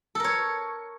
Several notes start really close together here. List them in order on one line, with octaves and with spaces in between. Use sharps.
A4 A#4 C#5